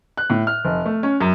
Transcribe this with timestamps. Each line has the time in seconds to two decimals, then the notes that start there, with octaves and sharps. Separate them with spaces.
0.17 F#6
0.30 A2
0.47 F6
0.65 F1
0.85 A3
1.03 C#4
1.21 F#2